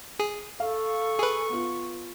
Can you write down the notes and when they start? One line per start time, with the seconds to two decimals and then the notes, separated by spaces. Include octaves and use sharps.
0.19 G#4
0.60 A4 F5 C#6
1.18 G#4 B4 G#5
1.50 B3 F4